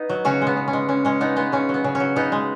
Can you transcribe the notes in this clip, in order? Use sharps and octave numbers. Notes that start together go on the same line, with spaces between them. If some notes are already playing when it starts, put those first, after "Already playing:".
Already playing: B3 D#4
F#3
C#3 C#4 F#4
G#3
B3
C#3
C#4
G#3
C#3 C#4
G#3 C#4
C#3 B3 D#4
G#3 B3
C#3 C#4
F#3
B3
C#3
C#4
F#3
C#3 B3 D#4
G#3